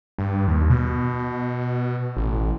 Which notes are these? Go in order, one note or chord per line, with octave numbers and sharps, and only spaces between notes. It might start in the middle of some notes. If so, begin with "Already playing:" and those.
G2
D#2
B2
A1